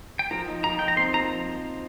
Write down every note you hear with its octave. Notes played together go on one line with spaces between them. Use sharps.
G5
F3 A#5
D#4
F3 A#5
D#4 G5
A#5
C4 C6
F3 A#5